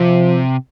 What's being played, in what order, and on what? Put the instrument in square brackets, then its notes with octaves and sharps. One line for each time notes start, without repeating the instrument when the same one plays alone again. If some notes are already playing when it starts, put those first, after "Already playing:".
Already playing: [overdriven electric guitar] C3 [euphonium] F3